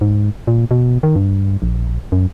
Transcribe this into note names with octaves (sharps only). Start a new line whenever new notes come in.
G#2
A#2
B2
D#3
G2
A#1
F#2